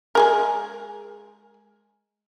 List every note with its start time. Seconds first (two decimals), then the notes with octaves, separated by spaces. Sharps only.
0.15 G#3 G#4 A#4